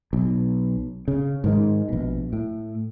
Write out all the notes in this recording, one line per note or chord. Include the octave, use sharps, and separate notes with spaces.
B1
C#3
G#2 D#3 G#3
A#1 B2
A2